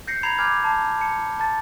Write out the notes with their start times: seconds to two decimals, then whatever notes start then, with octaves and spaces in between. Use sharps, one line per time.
0.08 G6 A#6 C7 C#7
0.23 A#5 B5 G#6 C7 F7
0.38 G#5 D6 F6 G6 G#6
0.64 A5 C7
1.00 A5 C#7
1.40 A5 A6